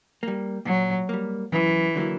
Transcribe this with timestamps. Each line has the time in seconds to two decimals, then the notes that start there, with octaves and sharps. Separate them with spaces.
0.23 G3 A#3
0.65 A#2 F#3
1.09 G3 A#3
1.52 F#2 E3
1.95 D3 F#3 A#3 E4